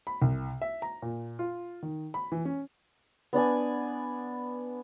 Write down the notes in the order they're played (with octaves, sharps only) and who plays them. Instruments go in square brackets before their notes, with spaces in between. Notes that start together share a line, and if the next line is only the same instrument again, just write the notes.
[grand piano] B5
C2
E5
A#5
A#2
F4
D#3
B5
E3
C#4
[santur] B3 D4 D5 G#5